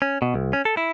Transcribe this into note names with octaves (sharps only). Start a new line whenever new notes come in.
C#4
B2
C2
C#4
A4
E4